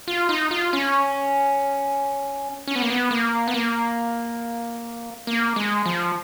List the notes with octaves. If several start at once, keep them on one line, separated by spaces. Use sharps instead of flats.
F4
D#4
F4
C#4
C#4
B3
A#3
B3
A#3
B3
A#3
A#3
G#3
F3